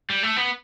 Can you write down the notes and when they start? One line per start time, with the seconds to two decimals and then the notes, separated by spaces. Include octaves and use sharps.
0.10 G3
0.23 A3
0.37 B3